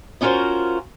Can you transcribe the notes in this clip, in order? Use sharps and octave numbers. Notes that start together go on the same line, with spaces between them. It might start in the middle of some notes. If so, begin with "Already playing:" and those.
B3 C#4 F4 F#4 A#4 C5